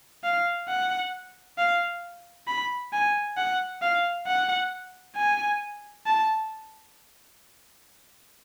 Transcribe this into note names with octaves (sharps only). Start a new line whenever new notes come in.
F5
F#5
F5
B5
G#5
F#5
F5
F#5
G#5
A5